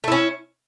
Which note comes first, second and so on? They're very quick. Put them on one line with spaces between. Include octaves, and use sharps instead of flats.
A3 E4 C#4